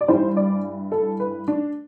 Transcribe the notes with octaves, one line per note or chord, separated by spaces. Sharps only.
D5
G2 E3 G3 C5
D5
A4
B4
D4